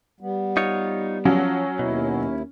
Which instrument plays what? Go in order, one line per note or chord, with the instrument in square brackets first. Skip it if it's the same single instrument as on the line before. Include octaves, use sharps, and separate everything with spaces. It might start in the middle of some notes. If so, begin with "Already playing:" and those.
[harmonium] G3 B3
[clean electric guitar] D#4 F4 C#5
[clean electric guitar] F3 [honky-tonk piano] F#3 [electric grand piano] C#4
[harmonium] D#2 E4 [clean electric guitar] B2